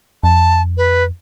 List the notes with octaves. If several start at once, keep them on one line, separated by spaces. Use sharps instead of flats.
F2 A5
B4